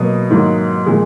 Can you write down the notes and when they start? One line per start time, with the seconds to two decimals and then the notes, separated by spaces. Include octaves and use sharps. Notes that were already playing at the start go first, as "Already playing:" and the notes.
Already playing: B2 F#3 A#3 D#6
0.30 G#2 D#3 F#3 A#3
0.86 A#2 F3 G#3